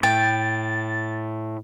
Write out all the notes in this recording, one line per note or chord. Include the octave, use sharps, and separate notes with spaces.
A2 G5 A6